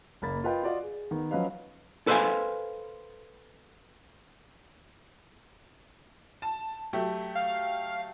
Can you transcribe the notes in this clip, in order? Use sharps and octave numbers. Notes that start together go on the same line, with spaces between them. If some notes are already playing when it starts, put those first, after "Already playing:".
F#1 A#3 B5 A6
F4 A#4 B4 D#5 G5
F4 F#4 D5 D#5
G#4
D#3 B3
F3 F#3 C#4 B4 D#5 F5
A4 B4 C5 D#5 F5 G#5
A5
F#3 A3 G4
F5